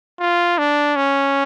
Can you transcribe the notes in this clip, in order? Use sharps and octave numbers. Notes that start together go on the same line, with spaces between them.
F4
D4
C#4